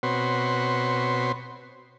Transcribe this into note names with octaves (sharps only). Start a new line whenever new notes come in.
B2 C4 F#4 B4 C#5 C6